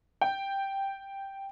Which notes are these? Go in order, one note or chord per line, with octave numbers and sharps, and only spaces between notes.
G5